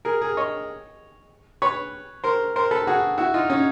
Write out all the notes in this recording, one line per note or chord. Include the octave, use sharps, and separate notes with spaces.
G#4 A#4
G#4 A#4
C#5 D#5
B4 C#5
A#4 C5
A#4 C5
A4 B4
F#4 G#4
E4 F#4
D#4 F4
C#4 D#4